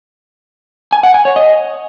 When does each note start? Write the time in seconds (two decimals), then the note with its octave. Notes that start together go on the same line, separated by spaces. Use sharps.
0.93 G#5
1.03 F#5
1.14 G#5
1.25 C#5
1.36 D#5